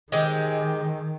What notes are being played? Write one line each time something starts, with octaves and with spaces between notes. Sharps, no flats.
D#3 G#3 C4 G4